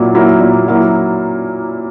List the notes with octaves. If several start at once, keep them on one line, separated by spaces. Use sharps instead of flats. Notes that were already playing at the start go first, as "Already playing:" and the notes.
Already playing: A#2 F#3 A#3 E4
F#3 A#3 E4
A#2
F#3 A#3 E4